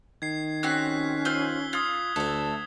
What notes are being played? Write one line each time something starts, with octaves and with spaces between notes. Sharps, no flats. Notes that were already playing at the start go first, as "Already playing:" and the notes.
D#3 G#6 C7
C4 C#4 F#4 G4 F#6 B6
F4 C5 E6 G6 G7
F4 D#6 G#6
D2 A3 A4 E5